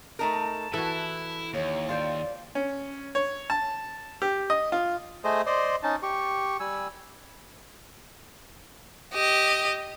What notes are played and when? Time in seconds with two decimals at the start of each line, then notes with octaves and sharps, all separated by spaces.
0.19 A3 D#4 A#4 A5
0.74 E3 E4 F#4 A4
1.54 D#2 C#5
1.89 F4 C5 D5 G5
2.55 C#4
3.15 C#5
3.50 A5
4.22 G4
4.50 D#5
4.72 F4
5.24 A3 G#4 C5 D#5
5.47 C5 D5 D#5 C6
5.83 C#4 D#4 A5
6.03 G4 C#6
6.60 G3 G#5 E6
9.14 G4 D#5